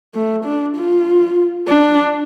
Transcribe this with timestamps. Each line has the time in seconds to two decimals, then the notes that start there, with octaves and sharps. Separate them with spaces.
0.14 A3
0.45 D4
0.76 F4
1.68 D4